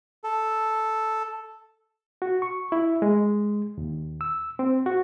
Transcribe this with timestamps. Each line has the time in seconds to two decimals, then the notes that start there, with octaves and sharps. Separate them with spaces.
0.24 A4
2.22 F#4
2.42 C#6
2.72 E4
3.02 G#3
3.78 D#2
4.21 E6
4.59 C4
4.86 F#4